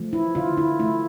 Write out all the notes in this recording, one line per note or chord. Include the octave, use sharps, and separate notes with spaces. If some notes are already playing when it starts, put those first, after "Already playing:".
Already playing: F3 A3
E4
D3 F4
E4
F3 A3 E4